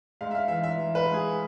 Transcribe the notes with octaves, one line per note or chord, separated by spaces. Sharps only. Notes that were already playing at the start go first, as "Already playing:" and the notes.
G#2 F5
E5
F5
E3 E5
E5
E3
B4
G#2
G#4